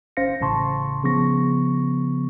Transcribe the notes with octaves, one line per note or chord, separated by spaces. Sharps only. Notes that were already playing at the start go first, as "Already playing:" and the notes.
G1 C#4 C5 F5 A#6 C#7
A1 A2 C#3 A5 C6 C#6
C#3 F3 B3 C#6 A#6